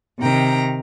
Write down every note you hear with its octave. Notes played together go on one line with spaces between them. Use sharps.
C3 D#3 G5 A#5